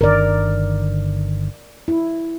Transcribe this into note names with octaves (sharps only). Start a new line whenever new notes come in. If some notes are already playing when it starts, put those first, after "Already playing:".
G1 D3 D#3 A#4 D5
E4